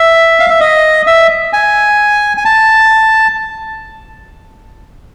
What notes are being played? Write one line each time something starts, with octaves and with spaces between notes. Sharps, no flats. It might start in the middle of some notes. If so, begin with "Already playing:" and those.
Already playing: E5
F5
E5
D#5
E5
G#5
G#5
A5